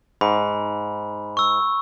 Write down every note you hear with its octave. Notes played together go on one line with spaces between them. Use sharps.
G#2 B5
C#6 E6